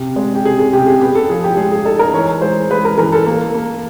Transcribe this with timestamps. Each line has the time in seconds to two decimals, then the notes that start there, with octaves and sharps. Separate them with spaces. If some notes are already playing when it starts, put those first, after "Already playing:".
Already playing: C3
0.16 G#3
0.35 G4
0.45 C3 G#4
0.59 G#4
0.73 C3 G4
0.87 G#4
1.01 B3 G4
1.15 A4
1.29 F3 G#4
1.44 G4
1.57 G#3 G#4
1.72 G#4
1.85 D#4 A4
1.99 A#4
2.14 E3 C#5
2.42 G#3 C5
2.71 G#3 B4
2.85 A#4
2.98 E3 A#4
3.12 A4
3.26 A#3
3.55 A#3